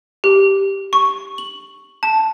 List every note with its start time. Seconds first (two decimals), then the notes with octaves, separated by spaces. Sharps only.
0.24 G4
0.93 C#6
1.38 F#7
2.03 A5